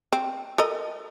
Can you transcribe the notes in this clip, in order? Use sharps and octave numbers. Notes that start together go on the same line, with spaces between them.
C4
A4 A#4 D#5